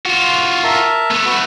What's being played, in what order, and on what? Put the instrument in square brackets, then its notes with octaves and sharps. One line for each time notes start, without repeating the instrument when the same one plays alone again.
[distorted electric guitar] F4 F#4
[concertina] A#4 E5 A5
[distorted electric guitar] A3 B3
[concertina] F#4 B4